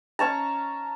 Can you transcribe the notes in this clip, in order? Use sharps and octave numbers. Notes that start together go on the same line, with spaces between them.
C#4 C#5 A5 A#5